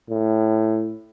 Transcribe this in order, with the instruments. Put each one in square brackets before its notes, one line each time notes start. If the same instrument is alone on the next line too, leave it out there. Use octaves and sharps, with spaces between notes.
[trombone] A2